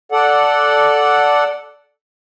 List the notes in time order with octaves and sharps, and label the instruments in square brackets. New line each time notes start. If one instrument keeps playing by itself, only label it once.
[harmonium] A4 D5 F#5